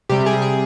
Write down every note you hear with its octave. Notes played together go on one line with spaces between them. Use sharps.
C3 G3 G4
G#4
G#4